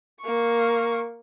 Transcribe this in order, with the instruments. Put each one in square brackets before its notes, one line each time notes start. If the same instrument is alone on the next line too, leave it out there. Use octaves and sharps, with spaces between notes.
[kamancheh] A#3 C#6